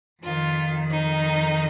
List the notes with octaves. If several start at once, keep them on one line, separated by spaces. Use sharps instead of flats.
F2 D#3 F4
D#4